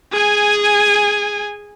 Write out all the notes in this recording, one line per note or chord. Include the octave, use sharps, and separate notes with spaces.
G#4 G#5